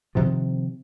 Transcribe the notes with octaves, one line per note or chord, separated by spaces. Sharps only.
C3 D#3 F3